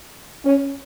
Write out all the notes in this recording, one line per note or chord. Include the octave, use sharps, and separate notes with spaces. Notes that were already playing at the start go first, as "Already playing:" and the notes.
C#4